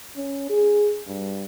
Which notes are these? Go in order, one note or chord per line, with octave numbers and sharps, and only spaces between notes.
C#4
G#4
G2